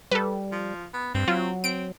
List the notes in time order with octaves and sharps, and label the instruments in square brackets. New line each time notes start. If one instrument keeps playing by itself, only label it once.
[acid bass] G3 [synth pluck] A4 B4
[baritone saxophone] F3
B3
[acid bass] G2 [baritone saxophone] C4
[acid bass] F#3 [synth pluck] F4
[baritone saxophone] C4 [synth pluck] D7